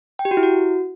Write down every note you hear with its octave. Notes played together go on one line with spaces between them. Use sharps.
G5
G4
F#4
E4
F#4